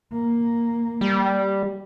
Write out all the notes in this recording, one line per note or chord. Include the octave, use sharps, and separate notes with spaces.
A#3
G3